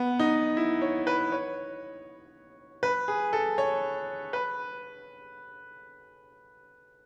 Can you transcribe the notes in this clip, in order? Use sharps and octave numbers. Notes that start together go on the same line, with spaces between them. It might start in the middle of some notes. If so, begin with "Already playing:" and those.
Already playing: B3
D#4
E4
C#5
B4
C#5
B4
G#4
A4
C#5
B4